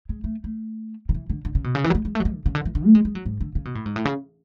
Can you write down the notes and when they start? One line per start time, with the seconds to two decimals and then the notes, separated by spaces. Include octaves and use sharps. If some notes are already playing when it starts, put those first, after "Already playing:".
0.09 G#3
0.24 A3
0.44 A3
1.09 D3
1.15 E3
1.30 D3
1.45 D3
1.55 C#3
1.64 B2
1.75 C#3
1.84 E3
1.90 F#3
1.95 G#3
2.05 G#3
2.15 A3
2.20 F#3
2.25 G#3
2.34 D3
2.46 C#3
2.55 D3
2.65 E3
2.75 D3
2.85 A3
2.95 G#3
3.05 G#3
3.15 F#3
3.26 G#2
3.41 D3
3.55 C#3
3.65 B2
3.75 A2
3.86 G#2
3.96 A2
4.05 C#3